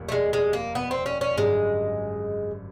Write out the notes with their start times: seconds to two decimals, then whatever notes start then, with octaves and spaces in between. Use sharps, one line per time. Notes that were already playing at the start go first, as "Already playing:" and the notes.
Already playing: F1 D#2 D#3 G3
0.09 A3
0.12 G#3
0.33 G#3
0.53 A#3
0.75 B3
0.91 C4
1.06 C#4
1.21 C#4
1.37 G#1 F#2 D3 G3 G#3